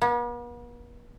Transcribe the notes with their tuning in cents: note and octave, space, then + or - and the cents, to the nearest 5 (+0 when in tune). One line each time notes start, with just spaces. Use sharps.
B3 -45